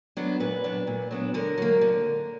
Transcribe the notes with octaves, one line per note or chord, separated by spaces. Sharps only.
F#3 B3 D4
A#2 B4
F#3 B3 D4
A#2
F#3 B3 D4
D3 A#4
F#3 A#3
D3